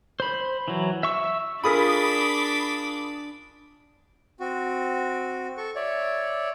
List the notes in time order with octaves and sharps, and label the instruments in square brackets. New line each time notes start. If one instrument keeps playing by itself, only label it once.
[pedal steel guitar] C5 B5
E3 F#3
E5 C#6 E6
[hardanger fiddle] D4 D6 [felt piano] F4 G#4 A#4 [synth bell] B5 D#6 B6
[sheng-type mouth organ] C4 F#4
A4 C#6
C#5 D5 E5